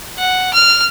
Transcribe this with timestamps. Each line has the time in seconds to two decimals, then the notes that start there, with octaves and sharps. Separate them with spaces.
0.18 F#5
0.53 F6